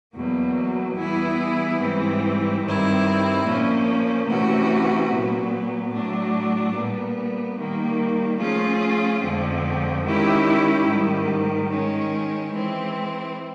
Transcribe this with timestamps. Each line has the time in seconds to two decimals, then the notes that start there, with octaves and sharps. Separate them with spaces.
0.15 E2 B2 F#3 A#3
0.97 E3 G3 B3 E4 G#4
1.81 G#2 E3 G3 C4
2.63 G2 D#3 G3 C4 E4
3.45 A#2 F3 A#3 C#4
4.27 C3 E3 A3 C#4 F#4
5.10 A#2 F#3 B3
5.92 A2 F#3 A3 D4
6.74 A#2 G3 B3
7.58 D#3 G3 A#3
8.40 F3 A3 C#4 F4 G#4
9.22 F2 D3 F3 G#3 C4
10.05 D#3 G#3 C#4 E4 G4
10.86 G#2 D#3 G3
11.69 D#3 G#3 C#4
12.52 E3 G#3 C4